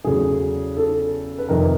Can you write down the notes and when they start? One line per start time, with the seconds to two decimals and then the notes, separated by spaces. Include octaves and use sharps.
0.04 E2 C#3 F#3 A3 G#4
0.77 A4
1.38 B4
1.49 F2 C3 D#3 A#4